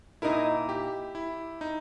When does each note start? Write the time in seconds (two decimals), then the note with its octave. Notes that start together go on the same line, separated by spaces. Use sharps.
0.22 A#2 A#3 D#4 E4 A#4
0.69 G4
1.15 E4
1.61 D#4